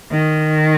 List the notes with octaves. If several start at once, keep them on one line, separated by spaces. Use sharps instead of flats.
D#3